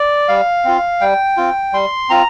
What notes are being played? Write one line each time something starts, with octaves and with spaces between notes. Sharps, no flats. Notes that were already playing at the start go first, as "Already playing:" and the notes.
Already playing: D5
G3 F5
C4 F4
G3 G5
C4 F4
G3 C6
C4 F4 A#5